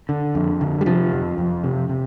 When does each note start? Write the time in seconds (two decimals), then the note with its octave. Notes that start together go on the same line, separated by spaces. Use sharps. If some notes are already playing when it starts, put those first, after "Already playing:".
0.09 D3
0.35 F2
0.61 D3
0.81 G3
0.86 C3 F3
1.13 F2
1.38 F2
1.64 C3
1.89 C3